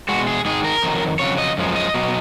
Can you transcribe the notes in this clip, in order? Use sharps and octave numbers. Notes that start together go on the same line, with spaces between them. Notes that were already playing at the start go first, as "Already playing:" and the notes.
B2 G#3 F#4
G#4
G#2 D#3 G#3 G#4
A#4
F2 D#3 F#3
F2 C#3 F#3 C#5
D#5
F#2 F3 G#3
D#5
B2 F#3